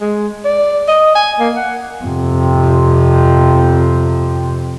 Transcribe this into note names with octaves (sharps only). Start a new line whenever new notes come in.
G#3
D5
D#5
G#5
A#3
F#5
F2 C3